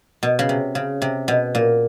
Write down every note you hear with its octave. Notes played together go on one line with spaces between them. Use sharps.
B2
C#3
C3
C#3
C3
B2
A#2